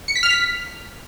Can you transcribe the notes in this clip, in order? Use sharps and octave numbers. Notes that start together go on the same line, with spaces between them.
C#7
B6
F6
B6